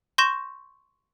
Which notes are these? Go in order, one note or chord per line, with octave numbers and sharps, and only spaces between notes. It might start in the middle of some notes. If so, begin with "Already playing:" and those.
C6 C#6 G6 A#6 E7